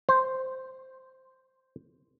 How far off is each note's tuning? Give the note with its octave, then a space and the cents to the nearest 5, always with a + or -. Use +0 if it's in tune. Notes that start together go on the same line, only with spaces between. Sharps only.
C5 -5